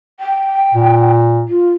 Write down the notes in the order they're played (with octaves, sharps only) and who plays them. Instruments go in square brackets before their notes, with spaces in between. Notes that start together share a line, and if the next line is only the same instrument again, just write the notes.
[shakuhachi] G5
[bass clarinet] A#2
[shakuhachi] F4